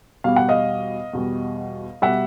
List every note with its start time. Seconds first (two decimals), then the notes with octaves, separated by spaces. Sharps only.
0.24 E2 B2 G3 F5
0.36 F#5
0.49 D#5 F5
1.13 E2 B2 G3
2.02 B2 G3 E5 F#5